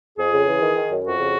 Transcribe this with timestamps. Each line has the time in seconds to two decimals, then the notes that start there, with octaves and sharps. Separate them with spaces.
0.18 F2 G#4
0.33 C#3
0.47 E3
0.62 D#3
0.76 D#3
0.91 F#2
1.05 F2 F#4
1.19 C#3